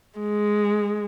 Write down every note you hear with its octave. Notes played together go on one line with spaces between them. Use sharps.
G#3